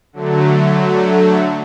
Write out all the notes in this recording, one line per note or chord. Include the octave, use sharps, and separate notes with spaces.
D3 F#3 A3